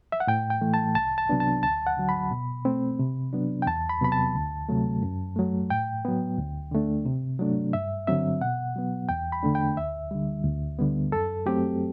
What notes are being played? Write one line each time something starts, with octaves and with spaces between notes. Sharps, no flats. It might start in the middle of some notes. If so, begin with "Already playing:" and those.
E5
F#5
A2 G5
G5
E3 A3
A5
C2 A5
A5
C3 F#3 B3 D4
A5
D2 A5
F#5
D3 F#3
B5
B2
A3 C4
C3
F#3 B3 D4
G5
E2 A5
B5
C3 F#3 B3 B5
A5
D2
C3 F#3 A3
F#2
F#3 A3
A2 G5
F#3 B3
D2
D3 A3 D4
C3
F#3 A3 D4
G2 E5
D3 F#3 C4 E5
B2 F#5
F#3 B3
E2 G5
B5
D3 A3 D4
G5
D2 E5
D3 G3
D2
D3 G3 B3
F#2 A4
F#3 A3 C4 G4